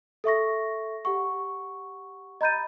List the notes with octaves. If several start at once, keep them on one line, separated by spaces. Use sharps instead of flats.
A4 E5 C#6 A#6
G4 F#5 C#6
D#5 A#5 B5 G6 A6 D#7